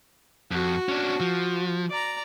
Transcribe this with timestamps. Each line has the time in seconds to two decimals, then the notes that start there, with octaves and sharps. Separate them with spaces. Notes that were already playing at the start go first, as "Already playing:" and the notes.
0.51 F2 F#4
0.89 C#4 D4
1.20 F3
1.90 D5 A#5